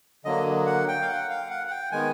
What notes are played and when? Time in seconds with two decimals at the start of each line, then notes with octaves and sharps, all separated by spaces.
0.25 D3 F#3 A#3 D#5
0.66 F#5
0.88 G5
1.02 F5
1.08 F#5
1.30 F5
1.50 F#5
1.67 F#5
1.71 G5
1.92 D#3 G#3 B3 G#5